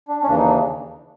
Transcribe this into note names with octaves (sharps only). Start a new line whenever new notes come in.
D4
C#4
D#2 C#3 E3 D4
D#4
D4